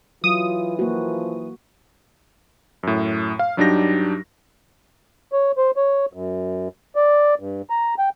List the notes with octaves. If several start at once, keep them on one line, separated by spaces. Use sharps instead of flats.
E3 F#3 F4 D#6
F3 A#3 F#4
F#2 A2
F5
G2 F#3 D4 D#4 G4 A#6
C#5
C5
C#5
F#2
D5
G2
A#5
G5